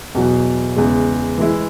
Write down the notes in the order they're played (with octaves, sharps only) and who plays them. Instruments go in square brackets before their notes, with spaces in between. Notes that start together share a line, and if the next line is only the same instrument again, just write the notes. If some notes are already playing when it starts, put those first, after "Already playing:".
[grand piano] E2 B2 F#3
E2 C#3 G#3
E3 G#3 E4